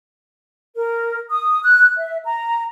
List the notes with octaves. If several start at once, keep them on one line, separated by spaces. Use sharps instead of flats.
A#4
D#6
F#6
E5
A#5